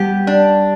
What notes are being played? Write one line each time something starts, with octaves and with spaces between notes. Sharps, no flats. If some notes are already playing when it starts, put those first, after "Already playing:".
Already playing: G3 B3 G4
D4